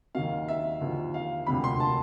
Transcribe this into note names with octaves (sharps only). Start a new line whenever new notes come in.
D#2 D#3 F#3 F5
E5
D#2 D3 F3
F5
E1 D2 C3 F3 B5
C6
A5